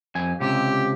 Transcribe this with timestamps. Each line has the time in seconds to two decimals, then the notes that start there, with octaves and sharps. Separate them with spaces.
0.15 F2 G#5
0.41 C#2 C3 G4